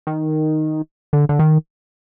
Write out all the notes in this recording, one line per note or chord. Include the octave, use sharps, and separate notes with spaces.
D#3
D3
D3
D#3